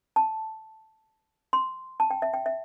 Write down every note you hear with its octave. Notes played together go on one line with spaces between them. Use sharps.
A5
C6
A5
G5
E5
G5
E5